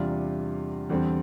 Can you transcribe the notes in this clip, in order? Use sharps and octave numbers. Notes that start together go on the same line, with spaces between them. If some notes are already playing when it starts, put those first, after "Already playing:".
Already playing: E2 C3 G3 D4 F4
E2 D3 G3 C4